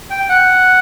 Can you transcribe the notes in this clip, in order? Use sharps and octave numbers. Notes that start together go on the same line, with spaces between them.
G5
F#5